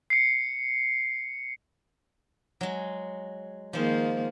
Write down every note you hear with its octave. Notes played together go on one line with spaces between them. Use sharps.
C7 C#7
F#3 G#3
D#3 F3 G#3 A#3 C5